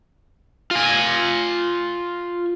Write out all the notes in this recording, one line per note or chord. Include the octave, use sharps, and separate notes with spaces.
F4 G#5